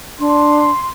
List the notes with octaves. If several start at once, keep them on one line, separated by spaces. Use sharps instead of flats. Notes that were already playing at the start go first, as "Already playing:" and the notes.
D4 C6